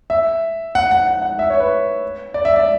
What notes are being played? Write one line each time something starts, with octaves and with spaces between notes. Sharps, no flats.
E5
F#5
F#5
F#5
F#5
E5
C#5
B4
D5
E5
D5